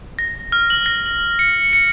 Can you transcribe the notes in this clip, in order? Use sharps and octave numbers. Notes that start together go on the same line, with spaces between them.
A#6
F6
F#7
A#6
F#7
C#7
C#7